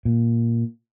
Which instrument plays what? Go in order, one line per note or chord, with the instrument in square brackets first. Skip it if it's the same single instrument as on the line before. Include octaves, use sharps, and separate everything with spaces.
[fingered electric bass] A#2